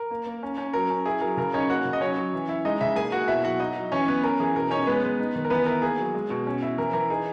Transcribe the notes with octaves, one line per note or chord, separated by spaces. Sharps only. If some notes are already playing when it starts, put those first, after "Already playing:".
Already playing: A#4
A#3
A#3
C#4
C#4
F#3 A#4
C#4
E4 G#4
F#3 A#4
C#3 A#4
C#4 D#4 C#5
A#3 F#4 F#5
C#3
D#5
F#3 C#4 C#5
F#3
E3
E4
G#3 D#4 D#5
C#3 E4 E5
A#3 G#4 G#5
A#3 F#4 F#5
B2 E4 E5
F#3 F#4 F#5
D#4 E4 D#5
F#3
E3 C#4 C#5
B3 B4
C#4 A#4
E3 G#4
B2 A#4
C#4 D#4 C#5
G#3 B3 B4
G#3
D#4
D#3
A#4
E3 B3 B4
E4 A#4
A#3 G#4
F#3
G#3
B2
C#4
E4
E3 A#4
E3 A#4
D#4 G#4